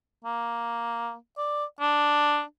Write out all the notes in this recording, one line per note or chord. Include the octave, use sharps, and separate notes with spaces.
A#3
D5
D4